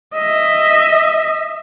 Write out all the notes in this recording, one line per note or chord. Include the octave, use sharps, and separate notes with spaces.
D#5 E5